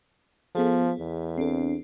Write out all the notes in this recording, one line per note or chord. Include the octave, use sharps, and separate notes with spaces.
F3 B3 G#4 A4
E2
C4 D4 A4